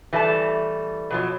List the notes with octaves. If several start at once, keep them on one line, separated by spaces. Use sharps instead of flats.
E3 G3 A3 D#4 A5
B2 F3 F#3